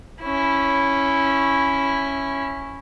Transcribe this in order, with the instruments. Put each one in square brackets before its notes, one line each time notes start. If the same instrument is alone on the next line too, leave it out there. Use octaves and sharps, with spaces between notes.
[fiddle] C#4 E4